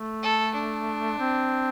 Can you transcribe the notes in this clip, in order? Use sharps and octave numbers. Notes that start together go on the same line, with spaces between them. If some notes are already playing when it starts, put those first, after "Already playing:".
Already playing: A3
A4
D4
C4